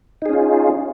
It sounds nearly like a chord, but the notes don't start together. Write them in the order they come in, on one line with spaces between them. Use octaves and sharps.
D#4 G#4 C#4 F4